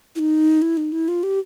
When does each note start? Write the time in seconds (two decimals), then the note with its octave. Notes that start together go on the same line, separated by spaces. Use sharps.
0.16 E4
0.19 D#4
0.62 E4
0.77 D#4
0.92 E4
1.08 F4
1.23 G4